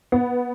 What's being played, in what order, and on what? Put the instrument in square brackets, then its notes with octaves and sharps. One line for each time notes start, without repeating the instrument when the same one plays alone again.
[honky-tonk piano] B3